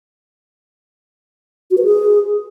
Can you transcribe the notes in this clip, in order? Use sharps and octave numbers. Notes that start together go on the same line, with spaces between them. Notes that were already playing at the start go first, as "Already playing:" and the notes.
F#4
B4
G#4